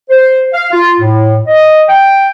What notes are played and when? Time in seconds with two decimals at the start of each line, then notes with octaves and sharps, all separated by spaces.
0.10 C5
0.53 F5
0.72 F4
1.00 A2
1.47 D#5
1.89 G5